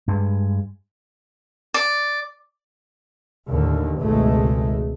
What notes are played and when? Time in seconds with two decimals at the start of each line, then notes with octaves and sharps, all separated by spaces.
0.08 G2 G#3
1.74 D5
3.49 D#2 A2 D3
4.00 G#1 C#2 B2 G#3 A3